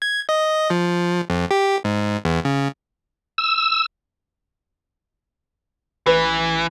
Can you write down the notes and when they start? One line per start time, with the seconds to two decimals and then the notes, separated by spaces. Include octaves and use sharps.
0.02 G#6
0.29 D#5
0.70 F3
1.30 F2
1.51 G4
1.84 G#2
2.25 E2
2.45 C#3
3.38 E6
6.06 A1 E3 B4